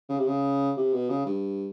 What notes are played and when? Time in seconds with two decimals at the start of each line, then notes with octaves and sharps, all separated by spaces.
0.09 C#3
0.18 C3
0.27 C#3
0.76 C3
0.93 B2
1.09 C#3
1.26 G2